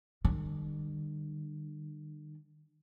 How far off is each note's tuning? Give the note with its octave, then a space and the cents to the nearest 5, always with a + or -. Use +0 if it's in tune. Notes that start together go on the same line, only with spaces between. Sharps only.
D#3 -45 G3 +15